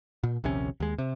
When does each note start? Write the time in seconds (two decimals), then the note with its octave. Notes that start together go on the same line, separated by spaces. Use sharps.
0.23 A#2
0.44 A#1 D#2 C3 C#4
0.80 D#2 G#3
0.98 C3